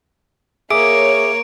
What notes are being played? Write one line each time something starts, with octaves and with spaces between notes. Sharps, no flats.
A#3 G#4 C#5 E5 D6 D7